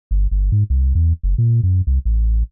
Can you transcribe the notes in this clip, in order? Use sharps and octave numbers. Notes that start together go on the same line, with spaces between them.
G1
G1
G#2
C2
E2
F#1
A#2
F#2
C2
A1